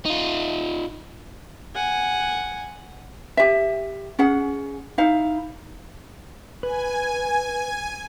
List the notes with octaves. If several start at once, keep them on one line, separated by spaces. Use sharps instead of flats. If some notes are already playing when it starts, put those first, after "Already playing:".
D#4 F4
F#5 G#5
G4 E5
C#4 G#4 F#5
D#4 E4 F5
B4 G#5